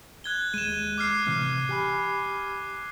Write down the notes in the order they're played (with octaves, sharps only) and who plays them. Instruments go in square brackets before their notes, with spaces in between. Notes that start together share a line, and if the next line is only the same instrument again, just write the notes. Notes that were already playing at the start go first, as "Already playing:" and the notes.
[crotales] F#6 G#6 G7
[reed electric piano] D#2 G#3 [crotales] D#7 E7
[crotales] D6 F6 C7
[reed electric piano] A2 C3 E3
G4 G#5 B5